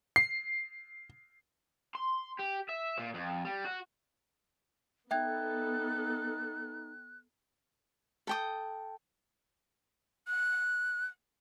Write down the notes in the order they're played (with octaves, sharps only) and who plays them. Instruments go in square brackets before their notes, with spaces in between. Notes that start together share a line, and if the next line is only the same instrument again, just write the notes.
[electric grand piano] C7
[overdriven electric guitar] C6
G4
E5
A#2
F2
G3
F#4
[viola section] B3 A4 [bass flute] D#4 [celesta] E5 G5 G#6 [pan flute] F#6
[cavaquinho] A4 G5 D#6
[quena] F#6